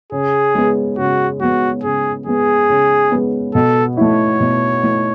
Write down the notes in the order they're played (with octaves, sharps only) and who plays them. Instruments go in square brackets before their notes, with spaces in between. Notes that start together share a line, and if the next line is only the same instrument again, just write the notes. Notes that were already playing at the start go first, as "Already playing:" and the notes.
[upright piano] C#3 [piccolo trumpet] G#4
[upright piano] G#3 B3
[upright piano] C#3 [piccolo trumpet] F#4
[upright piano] G#3 B3 [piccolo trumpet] F#4
[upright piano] C#3 [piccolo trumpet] G#4
[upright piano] G#3 B3 [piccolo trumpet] G#4
[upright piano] C#3
G#3 B3
[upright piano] B2 [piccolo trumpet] A4
[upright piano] A3 E4 [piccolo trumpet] C#5
[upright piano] B2
A3 E4